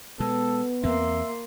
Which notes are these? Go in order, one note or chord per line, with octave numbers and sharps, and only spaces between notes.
B2 G#3 B3 A4
E2 A#3 C4 E5 C6